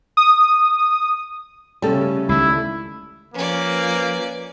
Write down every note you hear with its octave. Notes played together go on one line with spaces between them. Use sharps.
D#6
C#3 G3 A3 C#4 A4
C#2 D#3 A3 E4
F3 A#3 C#4 B4 D5